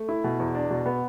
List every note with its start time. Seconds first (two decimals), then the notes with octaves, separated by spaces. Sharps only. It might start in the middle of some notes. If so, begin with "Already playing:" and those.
Already playing: A3
0.09 E4
0.24 B2
0.39 E2
0.55 D4
0.70 B2
0.86 B3